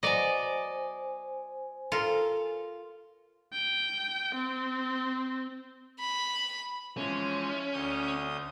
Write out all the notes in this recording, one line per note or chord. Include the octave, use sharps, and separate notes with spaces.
F#3 B3 C5 D5 D#5 G#5
F4 A4 A#4
G5
C4
B5
E3 F3 G#3 C#4
D2 D#6 G6